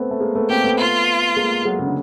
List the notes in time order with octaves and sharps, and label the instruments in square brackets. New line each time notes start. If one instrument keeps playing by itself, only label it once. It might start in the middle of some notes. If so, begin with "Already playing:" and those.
Already playing: [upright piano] A3 B3 C4
A3
G#3 A#3
A3 B3
[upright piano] A#3 C4 [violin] G4
[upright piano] A3 B3
[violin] F4
[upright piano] G#3 A#3
F#3 G#3
C#3
D3